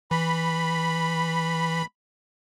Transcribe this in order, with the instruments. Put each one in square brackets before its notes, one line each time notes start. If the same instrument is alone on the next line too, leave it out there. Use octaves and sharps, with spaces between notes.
[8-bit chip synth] E3 [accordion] B5